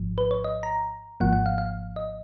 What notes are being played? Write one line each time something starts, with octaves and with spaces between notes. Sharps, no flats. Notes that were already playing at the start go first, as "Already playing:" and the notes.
Already playing: G#1 G#2 F3
B4
C#5
D#5
A#5
G#1 G#2 F3 A#3 F#5
F#5
F5
F5
D#5